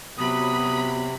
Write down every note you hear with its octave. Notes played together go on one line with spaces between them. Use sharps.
C3 F#3 B3 B5 D#6